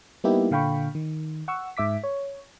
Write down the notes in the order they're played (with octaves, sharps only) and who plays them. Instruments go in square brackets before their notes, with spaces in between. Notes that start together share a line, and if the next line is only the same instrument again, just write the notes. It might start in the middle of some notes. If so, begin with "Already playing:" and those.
[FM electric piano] G3 A#3 B3 D#4 E4 G4
A#2 D3 F5 G5 B5 C#6
D#3
F#5 C#6 E6
G#2 E5 D6 B6
C#5